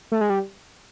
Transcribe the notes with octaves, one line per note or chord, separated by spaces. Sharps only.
A3
G#3
G3